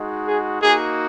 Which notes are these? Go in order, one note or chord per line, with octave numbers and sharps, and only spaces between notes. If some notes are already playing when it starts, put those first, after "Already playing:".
Already playing: G#3 D#4 F#4
G#4
A#3 D#4 F#4 G#4